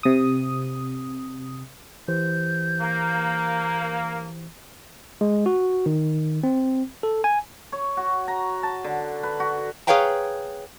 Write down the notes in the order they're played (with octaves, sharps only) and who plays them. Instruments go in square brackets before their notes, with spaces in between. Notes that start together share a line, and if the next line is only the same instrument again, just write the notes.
[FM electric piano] C3 D#6
[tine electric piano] E3 G4 C5 [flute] G6
[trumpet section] A#3
[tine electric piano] G#3
F#4
D#3
C4
A4
G#5
[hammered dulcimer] C#5
F#4
A#5
A5
D3
B4
F#4
[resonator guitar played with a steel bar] G#4 B4 C#5 F5 G5 A#5